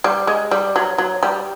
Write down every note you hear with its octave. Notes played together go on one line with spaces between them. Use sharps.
G3
G#3
G3
F#3
F#3
G3